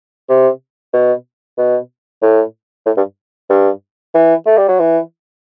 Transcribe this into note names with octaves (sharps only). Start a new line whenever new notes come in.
C3
B2
B2
A2
A2
G2
G2
E3
A3
G3
F#3
E3